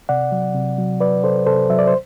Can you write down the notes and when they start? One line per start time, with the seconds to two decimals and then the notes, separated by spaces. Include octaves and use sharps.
0.09 C3 D5 F#5
0.32 F#3
0.55 C3
0.78 F#3
1.00 F#3 B4 D5
1.23 C3 A4 C5
1.46 C3 A4 C5
1.70 F#3 E5
1.79 D5
1.87 C5